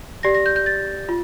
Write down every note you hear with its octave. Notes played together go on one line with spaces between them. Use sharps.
G4 D5 A#6
A#6
G6
G6
A6
F4